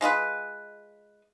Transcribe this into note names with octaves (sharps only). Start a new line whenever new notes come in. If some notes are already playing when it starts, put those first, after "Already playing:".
G#3 F4 G#4 B4